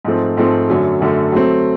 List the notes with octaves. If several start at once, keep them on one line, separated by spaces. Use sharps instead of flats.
G#2 F3 A3 C4
G#2 F3 A3 C4
F#2 D3 F#3 A3
F#2 D3 F#3 A3
F#3 A3 C4